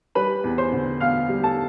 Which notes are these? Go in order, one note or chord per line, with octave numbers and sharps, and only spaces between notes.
G3 B4 B5
E2
C5 C6
D3
B3 F5 F6
G3
A4 A5